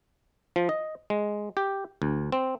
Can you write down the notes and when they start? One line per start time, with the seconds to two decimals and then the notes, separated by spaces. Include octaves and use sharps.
0.56 F3
0.69 D#5
1.10 G#3
1.57 G4
2.02 D2
2.32 C4